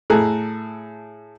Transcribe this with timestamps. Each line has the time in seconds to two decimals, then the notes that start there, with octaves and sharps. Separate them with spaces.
0.10 A2 G#4 A4 A#5 F#6